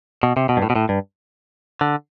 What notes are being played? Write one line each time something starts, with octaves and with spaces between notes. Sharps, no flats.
B2
C3
B2
G2
A2
B2
A2
G2
D3